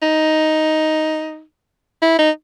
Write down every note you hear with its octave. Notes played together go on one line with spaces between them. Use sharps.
D#4
E4
D#4